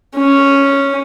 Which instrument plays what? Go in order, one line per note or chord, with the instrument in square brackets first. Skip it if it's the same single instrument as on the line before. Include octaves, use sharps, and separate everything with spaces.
[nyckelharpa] C#4